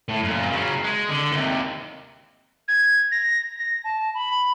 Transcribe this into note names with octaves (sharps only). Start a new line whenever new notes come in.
A2
F#2 A#2
C#3 F#3
G#3
D3
D#2 C3
G#6
A#6
A#6
A5
B5